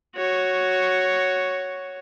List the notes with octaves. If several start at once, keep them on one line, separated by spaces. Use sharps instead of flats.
F#4 C#5